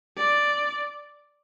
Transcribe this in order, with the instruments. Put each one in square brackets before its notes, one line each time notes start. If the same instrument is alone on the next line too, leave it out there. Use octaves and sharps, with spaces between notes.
[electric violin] D5